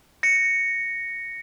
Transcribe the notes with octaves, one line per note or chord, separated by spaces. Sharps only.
A#6 C#7